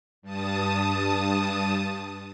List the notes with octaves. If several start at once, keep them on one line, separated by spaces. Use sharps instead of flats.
G2 A5 D#6